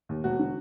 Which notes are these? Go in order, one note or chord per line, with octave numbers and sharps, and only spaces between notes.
D#2
E1 F#4
D3